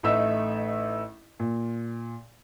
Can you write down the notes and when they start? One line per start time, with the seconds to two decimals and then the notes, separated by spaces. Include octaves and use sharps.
0.03 A1 A3 D#4 E5 E6
1.40 A#2